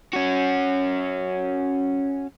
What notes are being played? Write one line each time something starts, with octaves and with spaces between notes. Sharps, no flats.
C#4 F#4